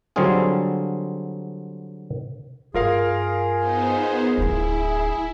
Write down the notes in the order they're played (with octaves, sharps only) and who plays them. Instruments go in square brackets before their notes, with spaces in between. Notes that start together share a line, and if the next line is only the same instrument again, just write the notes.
[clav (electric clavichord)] D3 F#3 G3 C4 F4 G#4
[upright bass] G2 [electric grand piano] F4 A#4 F5 [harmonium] G#4
[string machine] B3 D#4 C5
[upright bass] D1 D4 [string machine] E4